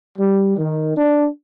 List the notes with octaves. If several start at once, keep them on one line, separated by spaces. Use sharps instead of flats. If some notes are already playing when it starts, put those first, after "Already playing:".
G3
D#3
D4